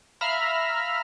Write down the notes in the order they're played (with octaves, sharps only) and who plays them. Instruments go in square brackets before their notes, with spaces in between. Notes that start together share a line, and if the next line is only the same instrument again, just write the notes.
[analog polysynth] E5 F5 A#5 B5 F6